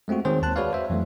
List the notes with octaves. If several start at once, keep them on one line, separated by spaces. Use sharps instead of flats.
G#3 A3 C4 F4 F#4
D#3 G#3 C4 G#4 C5 C#5
D#2 A5 F#6
F#4 G#4 B4 C#5 D5 F5
C5 E5
F2 E3 F#3 A3